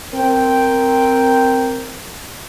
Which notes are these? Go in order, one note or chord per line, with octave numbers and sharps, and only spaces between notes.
C4 A#4 G5